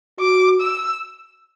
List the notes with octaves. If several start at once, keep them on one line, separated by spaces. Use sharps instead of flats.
F#4 D6
E6